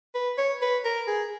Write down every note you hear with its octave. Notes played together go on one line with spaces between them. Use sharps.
B4
C#5
B4
A#4
G#4